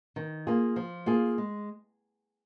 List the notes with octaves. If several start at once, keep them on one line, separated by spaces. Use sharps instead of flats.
D#3
A#3 F4 G#4
F3
A#3 F4 G#4
G#3